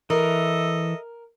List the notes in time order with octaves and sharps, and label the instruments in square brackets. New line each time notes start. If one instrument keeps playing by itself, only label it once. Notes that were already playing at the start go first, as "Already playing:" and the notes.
[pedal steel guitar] E3 [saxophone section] A4 D#5 E5 [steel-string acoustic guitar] A#4